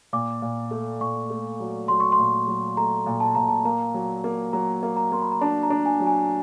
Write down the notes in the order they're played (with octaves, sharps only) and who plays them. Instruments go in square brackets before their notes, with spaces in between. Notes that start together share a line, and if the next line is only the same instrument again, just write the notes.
[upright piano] A#2 [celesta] D6
[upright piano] A#2
A3
[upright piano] A#2 [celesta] C#6
[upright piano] A3
F#3
[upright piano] F#3 [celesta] C6
[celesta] C#6
C6
[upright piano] A#2
F#3
[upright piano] A3 [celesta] A#5
[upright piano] A#2
[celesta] A5
[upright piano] A#2 [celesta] A#5
[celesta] A5
[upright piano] A#3 [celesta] A#5
[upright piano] F#3
A#3
[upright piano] F#3 [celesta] A#5
[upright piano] A#3
[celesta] A#5
[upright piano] A#3 [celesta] C6
[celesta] B5
A#5
[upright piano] D4 [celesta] A5
[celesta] A#5
[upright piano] D4
[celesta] G#5
[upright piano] F#3
[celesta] G#5